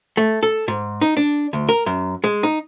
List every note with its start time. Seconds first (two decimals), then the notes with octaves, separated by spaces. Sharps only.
0.17 A3
0.43 A4
0.68 G#2
1.01 D#4
1.17 D4
1.53 D2
1.69 A#4
1.86 F#2
2.24 G#3
2.43 D#4